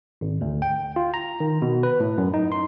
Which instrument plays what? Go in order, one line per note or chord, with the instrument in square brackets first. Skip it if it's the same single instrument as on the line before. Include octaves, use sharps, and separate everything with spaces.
[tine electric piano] G#1
D2
G5
F4
A#5
D#3
B2
B4
A2
F#2
D#4
C6